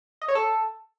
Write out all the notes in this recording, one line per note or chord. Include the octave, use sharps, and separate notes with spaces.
D#5
C#5
A4